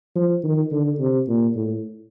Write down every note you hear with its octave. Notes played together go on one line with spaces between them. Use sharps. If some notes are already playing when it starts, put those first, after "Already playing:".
F3
D#3
D3
C3
A#2
A2